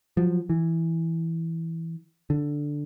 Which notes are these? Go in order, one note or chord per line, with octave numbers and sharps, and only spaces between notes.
F3 F#3
E3
D3